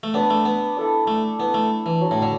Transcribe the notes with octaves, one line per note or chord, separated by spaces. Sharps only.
A3
B3 D4 B4 D5
A3
B3
E4 A4 D5
A3
B3 E4 D5
A3
E3
F#3 B3 D4
A2
D3